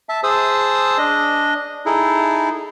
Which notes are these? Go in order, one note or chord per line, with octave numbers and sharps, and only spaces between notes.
E5 A5
G#4 C5 A5 D#6 E6
D4 D#5
D#4 E4 G#4 A4